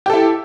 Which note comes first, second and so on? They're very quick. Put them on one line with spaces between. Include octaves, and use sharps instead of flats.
G4 A4 E4